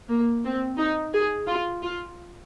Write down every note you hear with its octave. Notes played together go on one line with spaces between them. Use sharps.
A#3
C4
D#4
G#4
F4
F4